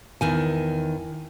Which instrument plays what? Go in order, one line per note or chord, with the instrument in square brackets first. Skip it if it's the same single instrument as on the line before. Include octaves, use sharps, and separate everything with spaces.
[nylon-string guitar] E2 D#3 G#5